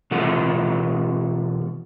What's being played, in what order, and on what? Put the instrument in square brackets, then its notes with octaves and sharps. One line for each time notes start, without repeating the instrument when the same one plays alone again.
[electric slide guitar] B2 E3 F4 A4 F#5